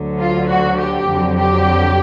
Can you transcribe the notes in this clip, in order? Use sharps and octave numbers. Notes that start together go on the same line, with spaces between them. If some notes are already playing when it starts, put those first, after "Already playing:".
Already playing: D2 D3 F#3
F4
F#4
G4
F2 D3 F#3
G4